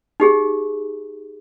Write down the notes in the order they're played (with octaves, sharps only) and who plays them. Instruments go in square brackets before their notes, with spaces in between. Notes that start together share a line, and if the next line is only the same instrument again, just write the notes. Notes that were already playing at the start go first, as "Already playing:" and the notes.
[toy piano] D#4 G4 G#4